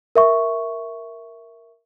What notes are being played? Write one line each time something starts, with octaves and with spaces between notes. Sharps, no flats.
A#4 E5 C#6